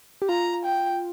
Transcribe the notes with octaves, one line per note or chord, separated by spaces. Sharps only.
G4
F4 A#5
G5